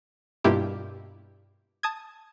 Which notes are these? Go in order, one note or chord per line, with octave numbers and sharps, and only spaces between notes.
G2 B2 A#3 E4 F4 G4
A5 D#6 G#6